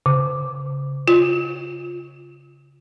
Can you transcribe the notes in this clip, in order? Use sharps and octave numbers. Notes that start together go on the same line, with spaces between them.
C#3
F4